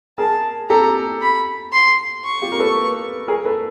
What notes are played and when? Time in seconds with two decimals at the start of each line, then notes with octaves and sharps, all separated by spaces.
0.18 G#4 A#4 A5
0.70 G4 A4 A#5
1.21 B5
1.73 C6
2.25 C#6
2.42 F4 G4
2.52 A#4
2.59 A4 B4
3.28 G#4 A#4
3.45 A4 B4